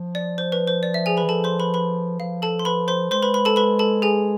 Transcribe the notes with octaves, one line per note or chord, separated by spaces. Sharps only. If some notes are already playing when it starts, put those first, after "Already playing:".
Already playing: F3
D5
C5
B4
C5
D5
E5
G#4 G#5
B4 B5
E3
F3 A4 A5
C5 C6
B4 B5
B4 B5
F3 F5
A4 A5
C6
B4 B5
C5 C6
G#3 C5 C6
B4 B5
B4 B5
A4 A5
B4 B5
A4 A5
G#4 G#5